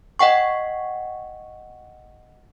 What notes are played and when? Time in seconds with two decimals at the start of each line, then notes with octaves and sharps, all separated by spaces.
0.19 D#5 F#5 G5 C#6